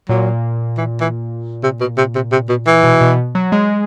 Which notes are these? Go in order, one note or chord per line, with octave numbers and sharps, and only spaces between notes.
A#2 F#3
E3
E3
C3
B2
C3
C3
C3
B2
E3
B2
B2
F#3
G#3